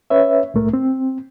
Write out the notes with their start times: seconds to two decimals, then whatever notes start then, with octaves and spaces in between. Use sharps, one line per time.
0.10 C#4 B4 C#5 E5
0.54 C2 A2 A3 A#4
0.73 C4